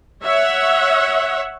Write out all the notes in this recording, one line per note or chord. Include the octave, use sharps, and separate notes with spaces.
C#5 E5 F#5